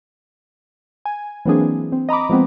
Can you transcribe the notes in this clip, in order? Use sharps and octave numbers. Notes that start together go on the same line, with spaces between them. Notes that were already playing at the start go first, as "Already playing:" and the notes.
G#5
E3 F#3 A#3 C4 D4 G#4
E3
C4
D#5 A#5 B5 D6
F3 G#3 B3 C4